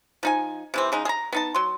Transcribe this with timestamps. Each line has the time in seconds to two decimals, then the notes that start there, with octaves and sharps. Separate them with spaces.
0.23 F3 D#4 G#5
0.74 C3 E3 C4
0.92 C#3 G#3 D#4
1.05 G#4 A#5
1.32 B3 D#4 A5
1.54 F#3 C6